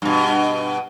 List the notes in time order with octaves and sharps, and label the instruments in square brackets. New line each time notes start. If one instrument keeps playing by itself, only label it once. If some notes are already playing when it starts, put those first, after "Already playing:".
[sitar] G2 B2